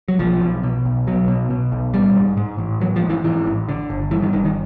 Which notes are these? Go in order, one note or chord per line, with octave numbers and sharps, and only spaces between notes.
F#3
B1 F3
B2
B2
B1
B1 F#3
B2
B2
B1
A1 G3
G#2
G#2
A1
A1 F#3
F3
G#2
E3
G#2 E3
A1
D3
G1
G2 E3
D#3
G1 D#3
D#3